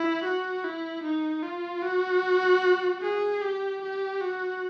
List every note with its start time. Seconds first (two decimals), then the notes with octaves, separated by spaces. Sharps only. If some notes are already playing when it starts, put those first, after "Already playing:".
Already playing: E4
0.24 F#4
0.64 E4
1.04 D#4
1.43 F4
1.82 F#4
3.02 G#4
3.42 G4
3.82 G4
4.21 F#4